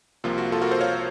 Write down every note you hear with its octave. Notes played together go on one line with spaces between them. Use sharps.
C2 C3 F3 A#3 F4
F#4
F4 A4
F#4 A#4
A4 C5
C#5 F5